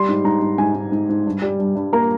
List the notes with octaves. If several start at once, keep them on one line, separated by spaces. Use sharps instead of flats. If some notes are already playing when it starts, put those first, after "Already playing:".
Already playing: G3 C6
G#2
G#2 A#5
G#2
G#2 G#5
G#2
G#2
G#2
G2
G3
G2
G2
A#3 A#5